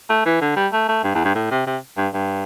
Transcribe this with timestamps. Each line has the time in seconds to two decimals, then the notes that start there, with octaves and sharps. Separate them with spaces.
0.10 A3
0.26 E3
0.42 D3
0.56 G3
0.73 A3
0.88 A3
1.04 G2
1.15 E2
1.25 G2
1.35 A2
1.51 C3
1.67 C3
1.97 G2
2.14 G2